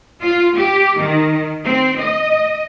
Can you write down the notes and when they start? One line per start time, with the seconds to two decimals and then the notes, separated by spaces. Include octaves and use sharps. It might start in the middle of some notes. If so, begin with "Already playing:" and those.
0.21 F4
0.55 G4
0.98 D#3
1.65 C4
1.99 D#5